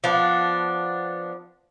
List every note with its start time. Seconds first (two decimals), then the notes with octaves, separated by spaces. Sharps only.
0.04 F3 B3 D4